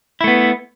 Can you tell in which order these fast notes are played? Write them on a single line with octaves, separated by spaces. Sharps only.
E4 A3 B3